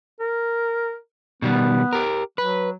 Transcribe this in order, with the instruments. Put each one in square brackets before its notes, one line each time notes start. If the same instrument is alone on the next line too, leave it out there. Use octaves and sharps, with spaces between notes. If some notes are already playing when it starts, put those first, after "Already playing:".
[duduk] A#4
[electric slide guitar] B2 D#3 G3 [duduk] B3
[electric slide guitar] G4 A#4
[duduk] F#3 [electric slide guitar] B4